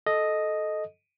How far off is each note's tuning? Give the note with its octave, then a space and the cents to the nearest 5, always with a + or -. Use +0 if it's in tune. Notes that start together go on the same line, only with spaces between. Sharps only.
A4 -15 D#5 +0